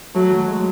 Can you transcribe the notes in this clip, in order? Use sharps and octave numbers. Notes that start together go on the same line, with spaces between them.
F#3 A3
F#3
G#3